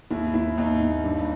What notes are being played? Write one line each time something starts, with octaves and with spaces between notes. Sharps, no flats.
D#2 E4
D#2 E4
D#2 D#4
D#2
G2